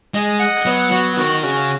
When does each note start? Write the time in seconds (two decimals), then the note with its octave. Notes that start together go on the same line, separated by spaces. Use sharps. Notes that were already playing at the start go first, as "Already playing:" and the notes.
0.14 G#3 D#5
0.39 F#5
0.66 F#3 B3
0.91 F#3 F#4
1.17 D#3 F#4
1.43 C#3 F#4